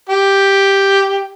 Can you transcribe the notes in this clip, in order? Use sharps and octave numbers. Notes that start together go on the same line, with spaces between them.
G4